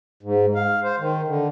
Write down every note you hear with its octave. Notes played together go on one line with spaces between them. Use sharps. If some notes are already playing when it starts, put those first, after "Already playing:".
G#2
F5
C5
D#3
D3